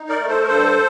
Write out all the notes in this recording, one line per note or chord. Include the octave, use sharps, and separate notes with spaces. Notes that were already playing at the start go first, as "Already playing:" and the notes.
Already playing: D#4
A#4 D5
A3
A4 C5
A#4
G2 A4 C5